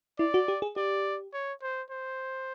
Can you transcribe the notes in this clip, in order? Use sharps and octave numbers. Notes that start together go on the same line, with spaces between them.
E4 D5
F#4
G4
G#4
G4 D5
C#5
C5
C5